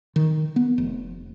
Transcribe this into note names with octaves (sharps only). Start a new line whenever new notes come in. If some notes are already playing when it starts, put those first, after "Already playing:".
D#3
B3
F1